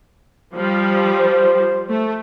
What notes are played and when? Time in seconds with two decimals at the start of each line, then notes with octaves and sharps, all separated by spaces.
0.55 F3 G3
1.18 C5
1.89 A3